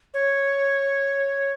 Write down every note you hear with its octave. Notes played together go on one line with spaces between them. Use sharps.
C#5